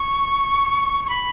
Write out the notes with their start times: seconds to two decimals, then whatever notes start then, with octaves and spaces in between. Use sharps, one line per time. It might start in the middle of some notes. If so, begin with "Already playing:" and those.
Already playing: C#6
1.05 C#6
1.10 B5